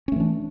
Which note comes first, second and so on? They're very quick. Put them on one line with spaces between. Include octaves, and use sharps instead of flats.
C#4 A3 E3 D4